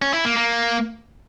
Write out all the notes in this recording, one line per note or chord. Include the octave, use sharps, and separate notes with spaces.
C#4
E4
A#3
A#3